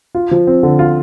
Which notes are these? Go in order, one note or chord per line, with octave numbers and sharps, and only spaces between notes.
F4
F3
C4
D3
F4